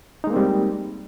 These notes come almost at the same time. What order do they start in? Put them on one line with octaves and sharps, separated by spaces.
D#4 G#3 A#3 C4 G3